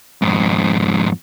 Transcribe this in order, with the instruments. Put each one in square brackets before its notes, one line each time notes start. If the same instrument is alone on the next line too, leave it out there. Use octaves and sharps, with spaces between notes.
[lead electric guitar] F2 G#2